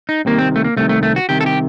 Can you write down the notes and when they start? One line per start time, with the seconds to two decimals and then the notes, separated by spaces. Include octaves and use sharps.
0.09 D#4
0.25 C2 C3 D#3 A#3
0.39 C4
0.56 A3
0.64 A#3
0.77 C2 C3 D#3 A3
0.89 A3
1.03 A3
1.16 F#4
1.29 C2 C3 D#3 G4
1.41 A4
1.46 G4